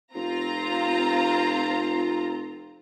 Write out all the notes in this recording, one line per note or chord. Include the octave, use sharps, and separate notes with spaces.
F1 C4 F4 A#5